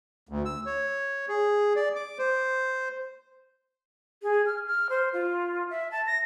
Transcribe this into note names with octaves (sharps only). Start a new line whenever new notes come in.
D2
E6
C#5
G#4
D5
D6
C5
G#4
F6
F6
C5
F4
E5
A5
A#6